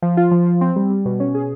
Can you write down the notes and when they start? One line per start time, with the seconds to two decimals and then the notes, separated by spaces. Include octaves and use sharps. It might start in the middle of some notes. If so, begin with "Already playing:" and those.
0.02 F3
0.17 F4
0.31 F3
0.47 F3
0.61 C4
0.76 G3
0.90 G3
1.05 B2
1.20 C#4
1.35 G#4